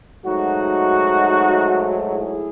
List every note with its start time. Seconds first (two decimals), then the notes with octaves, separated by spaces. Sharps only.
0.23 G#2 F#3 A3 D#4 F#4
2.10 E4 G#4